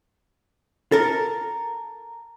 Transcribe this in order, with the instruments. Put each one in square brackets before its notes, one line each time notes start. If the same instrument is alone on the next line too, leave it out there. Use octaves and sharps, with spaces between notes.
[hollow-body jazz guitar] A4 A#4